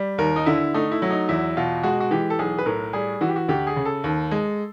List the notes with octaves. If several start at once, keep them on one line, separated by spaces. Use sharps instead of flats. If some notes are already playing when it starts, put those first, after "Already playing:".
Already playing: G3
D#2 A#4
D#4
D3 E4
A3 D#4
E4
F#3 E4
D#4
E2 E4
B2 F4
G#3 F#4
F#4
E3 G4
A4
B1 G#4
B4
A2 A#4
G3 G#4
E3 F#4
G4
F#4
D2 G4
G#4
C#3
A4
D#2
G#3